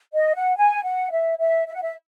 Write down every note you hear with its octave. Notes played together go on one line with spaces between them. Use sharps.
D#5
F#5
G#5
F#5
E5
E5
E5
F#5
E5